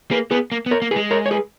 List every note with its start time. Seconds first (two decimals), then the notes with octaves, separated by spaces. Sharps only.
0.11 A#3 G#4 B4
0.31 B3 G#4 B4
0.52 A#3
0.66 B3
0.71 A#4 C#5
0.82 A#3
0.91 G#4 B4
0.96 G#3
1.11 A#4 C#5
1.26 C#5
1.31 G#4 B4